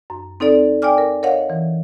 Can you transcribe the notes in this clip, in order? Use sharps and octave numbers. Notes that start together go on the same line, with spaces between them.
F#2
C4 D#4 A4 D5
D5 G5 G#5 D6 F6
A#4
A#4 C#5 D#5 F5 F#5
E3